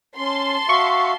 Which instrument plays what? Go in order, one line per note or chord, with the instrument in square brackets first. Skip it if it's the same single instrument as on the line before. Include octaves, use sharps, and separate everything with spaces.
[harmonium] C#4 [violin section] A5 C6
[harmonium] F#4 E5 F5 [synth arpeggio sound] C#6